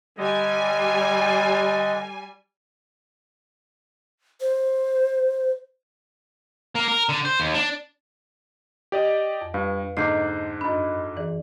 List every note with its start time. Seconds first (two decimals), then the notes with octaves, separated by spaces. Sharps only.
0.18 D3 G3 D#5 G#5
4.41 C5
6.75 A#3
6.88 A#4
7.09 D3
7.25 C5
7.40 D#2
7.54 D4
8.92 G4 D5 D#5
9.41 F2
9.54 G2 B4 F5
9.97 G#2 D3 A#3 D#5 D6 G6 C7
10.61 F#2 D4 D#5 B5
11.17 E3 G#4 D5